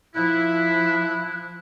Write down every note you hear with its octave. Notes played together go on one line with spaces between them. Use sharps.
F3 E4 F#6